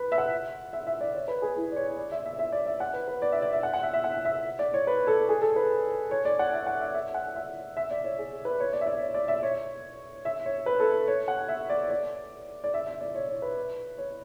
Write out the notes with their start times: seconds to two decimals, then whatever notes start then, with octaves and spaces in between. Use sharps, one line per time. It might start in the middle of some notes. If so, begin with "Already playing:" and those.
Already playing: B4
0.12 E5
0.18 F#5
0.73 E5
0.87 E5
1.01 D5
1.15 C#5
1.28 B4
1.42 G#4
1.56 E4
1.72 D5
1.76 C#5
1.97 D5
2.12 E5
2.26 E5
2.39 E5
2.52 D5
2.66 E5
2.80 F#5
2.94 B4
3.08 B4
3.22 D5
3.32 E5
3.42 D5
3.53 E5
3.63 F#5
3.74 F#5
3.83 E5
3.93 E5
4.04 F#5
4.25 E5
4.59 D5
4.74 C#5
4.87 B4
5.07 A4
5.29 G#4
5.42 A4
5.56 B4
6.11 C#5
6.25 D5
6.39 F#5
6.53 E5
6.67 F#5
6.81 E5
6.94 E5
7.14 F#5
7.35 E5
7.77 E5
7.90 D5
8.04 C#5
8.19 G#4
8.45 B4
8.60 C#5
8.73 D5
8.81 E5
8.86 D5
9.00 C#5
9.14 D5
9.28 E5
9.43 C#5
10.25 E5
10.46 C#5
10.66 B4
10.80 A4
11.08 C#5
11.28 F#5
11.49 E5
11.70 D5
11.90 D5
12.64 D5
12.74 E5
12.87 E5
13.01 D5
13.15 C#5
13.29 C#5
13.42 B4
13.98 C#5